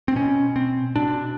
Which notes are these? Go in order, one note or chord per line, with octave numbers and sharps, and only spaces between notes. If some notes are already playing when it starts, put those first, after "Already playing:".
C4
B2 C#4
C4
B2 D4